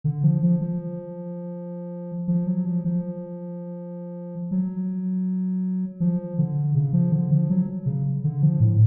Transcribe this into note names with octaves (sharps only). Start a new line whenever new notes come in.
D3
F3
F3
F3
F3
F#3
F3
F3
F#3
F3
D3
C#3
F3
D3
F3
F#3
C#3
D3
F3
A2